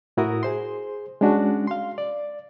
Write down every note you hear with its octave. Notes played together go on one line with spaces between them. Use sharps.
A2 E4 F#4 A#4 D#6
G#4 C5 C6
G#3 C#4 D4 F#4
F5 C6
D5